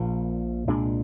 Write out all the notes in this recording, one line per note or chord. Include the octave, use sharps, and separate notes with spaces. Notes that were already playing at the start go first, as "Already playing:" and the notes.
Already playing: A#1 A#2 F3
C2 A#2 G#3 D4